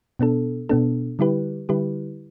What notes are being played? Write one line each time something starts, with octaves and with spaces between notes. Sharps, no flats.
B2 B3 D4 A4
B2 B3 D4 A4
D3 G3 E4 G4 B4
D3 G3 E4 G4 B4